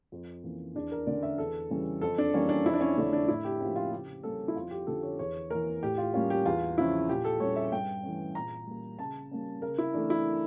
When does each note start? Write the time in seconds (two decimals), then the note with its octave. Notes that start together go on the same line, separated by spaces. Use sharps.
0.12 F2
0.44 E3 A#3 C#4
0.75 E2 D4
0.92 A#4
1.07 D3 A3 C#4 D5
1.23 E5
1.38 E2 A4
1.70 C#3 E3 G3 C#4
2.01 F2 A4
2.18 D4
2.34 E3 G3 A#3 C#4
2.49 D4
2.65 F2 E4
2.73 D4
2.81 C#4
2.98 D3 A3 C#4 D4
3.13 D4
3.28 A2 E4
3.45 G4
3.61 F3 A#3 C#4 G4
3.76 F4
3.91 C#3 G4
4.23 G3 A#3 C#4 A4
4.48 E4
4.56 F2 F4
4.71 G4
4.87 D3 F3 C#4 A4
5.03 C#5
5.19 E2 C#5
5.50 E3 A#3 A#4
5.82 A2 G4
5.98 F4
6.14 G3 A#3 C#4 F4
6.30 G4
6.45 E2 F4
6.78 C#3 F3 C#4 E4
7.09 A#2 G4
7.25 A4
7.40 G3 C#4 C#5
7.56 E5
7.72 G2 G5
8.03 E3 A3 C#4
8.35 A#2 A#5
8.67 G3 A#3
8.99 C#3 A5
9.31 G3 A#3 C#4
9.62 C#3 A#4
9.78 E4
9.94 E3 A3 D4
10.10 E4